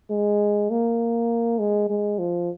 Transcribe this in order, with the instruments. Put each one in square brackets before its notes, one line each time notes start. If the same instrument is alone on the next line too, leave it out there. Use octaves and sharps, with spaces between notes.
[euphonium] G#3
A#3
G#3
G#3
F3